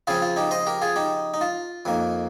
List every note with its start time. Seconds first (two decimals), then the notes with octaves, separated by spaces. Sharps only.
0.07 C#3 F3 C4 F4 G#4
0.22 F4
0.36 D#4 G4
0.51 C5 D#5
0.67 G4 A#4
0.82 F4 G#4
0.96 D#4 G4
1.34 D#4
1.41 F4
1.85 F2 D#3 A#3